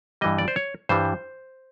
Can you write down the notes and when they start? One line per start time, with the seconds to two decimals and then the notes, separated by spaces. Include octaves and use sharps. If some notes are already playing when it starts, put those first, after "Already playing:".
0.21 G2 E3 G3 D#5
0.39 D5
0.48 C5
0.56 C#5
0.89 G2 E3 G3 C5